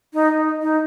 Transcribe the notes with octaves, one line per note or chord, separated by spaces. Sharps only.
D#4
D#4